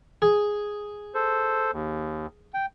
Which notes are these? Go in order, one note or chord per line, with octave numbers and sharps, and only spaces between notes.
G#4
A4 C5
D#2
G5